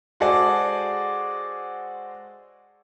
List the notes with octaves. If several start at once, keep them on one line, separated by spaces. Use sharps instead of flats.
G#3 F#4 G#4 A4 C5 D5